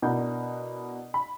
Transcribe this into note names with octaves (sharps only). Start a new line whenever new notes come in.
B2 D4 E4 A#4 F#5 G6
B5